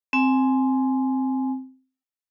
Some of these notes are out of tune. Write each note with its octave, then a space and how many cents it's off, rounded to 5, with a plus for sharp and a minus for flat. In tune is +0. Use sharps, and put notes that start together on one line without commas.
C4 +0 G#5 +15